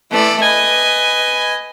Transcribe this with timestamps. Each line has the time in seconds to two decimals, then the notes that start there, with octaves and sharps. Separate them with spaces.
0.11 E3 A3 D5
0.41 B4 D#5 G#5